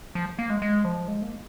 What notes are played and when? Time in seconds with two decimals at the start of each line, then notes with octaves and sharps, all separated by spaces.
0.15 F3
0.39 A#3
0.50 G#3
0.62 G#3
0.84 F3
1.08 G#3
1.22 A#3